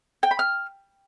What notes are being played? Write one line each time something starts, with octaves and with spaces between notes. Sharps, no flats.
G5
B5
F6